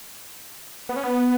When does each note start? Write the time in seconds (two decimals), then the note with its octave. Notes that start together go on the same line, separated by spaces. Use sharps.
0.89 B3
0.96 C#4
1.04 B3